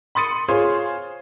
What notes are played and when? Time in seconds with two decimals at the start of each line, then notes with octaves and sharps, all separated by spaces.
0.15 B5 C6 D#6 A6 C#7 D#7
0.49 F4 G#4 C5 C#5 C6